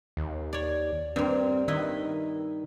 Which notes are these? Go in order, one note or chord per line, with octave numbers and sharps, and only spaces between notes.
D#2
C#5 D5
G2 A#3 C4
D#3 E4 B4 D#5